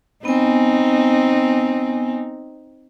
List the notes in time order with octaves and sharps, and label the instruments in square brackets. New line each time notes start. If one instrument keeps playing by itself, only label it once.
[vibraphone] B3 G#5 [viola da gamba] C4 D#4